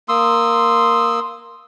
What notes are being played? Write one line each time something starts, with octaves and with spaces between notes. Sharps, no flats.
A#3 C6 D#6 E6